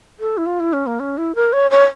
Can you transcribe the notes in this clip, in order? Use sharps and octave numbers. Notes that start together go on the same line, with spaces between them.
A4
E4
F4
E4
C#4
A#3
C#4
E4
A#4
C#5
C#5